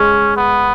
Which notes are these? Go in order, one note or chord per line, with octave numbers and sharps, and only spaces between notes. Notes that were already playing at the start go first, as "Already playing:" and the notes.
Already playing: G#3 C#4
B3